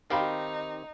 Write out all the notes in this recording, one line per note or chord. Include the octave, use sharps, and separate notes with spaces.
D#3 C4 D#4 G4 F5 G5 B5